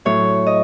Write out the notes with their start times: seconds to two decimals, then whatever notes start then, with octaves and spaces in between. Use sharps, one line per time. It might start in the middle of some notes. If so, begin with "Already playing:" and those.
0.05 A2 F#3 C#5
0.47 D#5